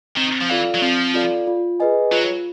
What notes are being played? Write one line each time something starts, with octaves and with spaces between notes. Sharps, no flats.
D#3 C4
F3
E3 F4 A4 D5 F5
F#3
F3 C4
F4 A4 D5 F5
F4
G#4 B4 D#5 G#5
F#3 F4